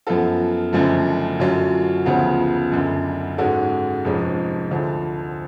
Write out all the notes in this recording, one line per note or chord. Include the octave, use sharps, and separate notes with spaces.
F#2 F3 B3 F4 A4
F#1 F#2 D3 F3 A3
F#2 D3 F#3 C#4 F4
D2 C#3 F3 B3 F4
F#1 F#2 D3
G#2 G#3 C#4 F#4 A4
F1 F2 F3 G#3 C#4
D2 D3 F3